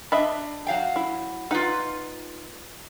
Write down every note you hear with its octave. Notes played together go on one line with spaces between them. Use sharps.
D4 D#5 E5 B5
F#3 F5 G5
E4
D#4 F4 B4 F#5